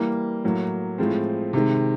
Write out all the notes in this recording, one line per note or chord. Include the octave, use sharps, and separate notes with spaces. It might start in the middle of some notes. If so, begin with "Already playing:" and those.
Already playing: E3 G3 A#3
A2 F#3 A#3
A2 F3 G#3 C4
C3 D#3 G#3